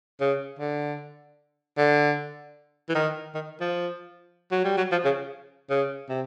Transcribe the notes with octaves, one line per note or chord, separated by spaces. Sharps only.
C#3
D3
D3
E3
D#3
D#3
F3
F#3
G3
F#3
F3
C#3
C#3
C3